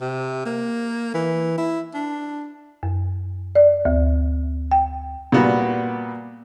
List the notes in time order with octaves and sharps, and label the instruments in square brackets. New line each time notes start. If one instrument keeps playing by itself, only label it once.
[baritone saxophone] C3
A#3
E3
E4
D4
[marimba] F#2
D5
D2
G5
[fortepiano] A#2 G3 B3 F#4